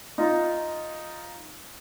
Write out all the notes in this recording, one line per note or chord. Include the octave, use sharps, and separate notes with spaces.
D#4 F4 A#5